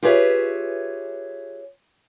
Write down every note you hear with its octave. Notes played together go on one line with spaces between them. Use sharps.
F4 G4 G#4 B4 C#5 E5